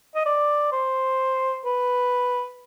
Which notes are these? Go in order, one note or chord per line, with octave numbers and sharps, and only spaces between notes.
D#5
D5
C5
B4